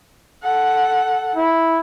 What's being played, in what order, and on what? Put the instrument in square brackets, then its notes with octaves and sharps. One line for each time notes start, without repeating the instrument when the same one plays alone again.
[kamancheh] A4 F#5
[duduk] E4